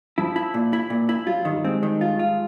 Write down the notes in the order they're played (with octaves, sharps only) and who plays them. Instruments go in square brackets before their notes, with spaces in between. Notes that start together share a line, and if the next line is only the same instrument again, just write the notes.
[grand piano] F3 [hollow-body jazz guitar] E4
[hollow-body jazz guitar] E4
A#2
E4
A#2
E4
[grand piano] F#3 [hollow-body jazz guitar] F4
[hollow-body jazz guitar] D#3 [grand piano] G3
[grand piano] G3
[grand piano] G#3 [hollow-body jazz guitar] C4
[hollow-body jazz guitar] D#3
F4
F4